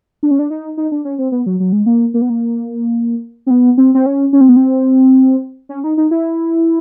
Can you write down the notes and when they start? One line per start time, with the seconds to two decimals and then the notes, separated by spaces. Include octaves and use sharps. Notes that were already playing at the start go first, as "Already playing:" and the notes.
0.23 D4
0.31 C#4
0.39 D4
0.50 D#4
0.77 D#4
0.92 D4
1.05 C#4
1.19 C4
1.32 B3
1.46 F#3
1.60 F#3
1.72 G#3
1.86 A#3
2.14 A#3
2.22 B3
2.30 A#3
3.47 C4
3.51 B3
3.78 C4
3.95 C4
4.06 C#4
4.33 C#4
4.41 C4
4.49 B3
4.56 C4
5.69 C#4
5.84 D#4
5.97 D#4
6.11 E4